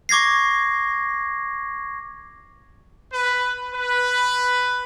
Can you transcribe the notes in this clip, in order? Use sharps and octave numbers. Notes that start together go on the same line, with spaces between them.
C#6 D6 G#6 A#6 C7
B4
B4